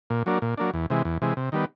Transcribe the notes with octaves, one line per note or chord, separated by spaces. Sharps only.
A#2
F#3 A#3 D4
A#2
F#3 A#3 D4
E2
C3 E3 G#3
E2
C3 E3 G#3
C3
D#3 G3 B3